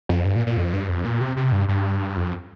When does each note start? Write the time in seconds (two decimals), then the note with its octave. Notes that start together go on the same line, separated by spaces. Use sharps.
0.09 F2
0.25 G2
0.36 A#2
0.47 A#2
0.57 F2
0.73 G2
0.89 F2
1.05 A#2
1.21 C3
1.37 C3
1.52 G2
1.68 G2
2.17 F2